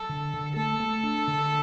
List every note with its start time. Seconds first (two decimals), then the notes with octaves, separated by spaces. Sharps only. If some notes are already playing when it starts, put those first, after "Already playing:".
Already playing: A4
0.09 D3
0.33 D3
0.56 A3 A4
0.80 A3
1.03 D4
1.27 D3